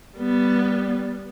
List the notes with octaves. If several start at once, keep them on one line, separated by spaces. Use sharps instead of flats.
G3 B3